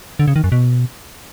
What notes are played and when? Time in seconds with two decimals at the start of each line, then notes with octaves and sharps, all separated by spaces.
0.19 D3
0.28 C#3
0.36 D#3
0.44 F#2
0.52 B2